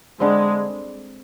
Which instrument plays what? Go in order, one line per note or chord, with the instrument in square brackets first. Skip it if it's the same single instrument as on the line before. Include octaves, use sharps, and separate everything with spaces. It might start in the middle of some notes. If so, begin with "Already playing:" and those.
[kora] D3 G3 C4 [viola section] G#3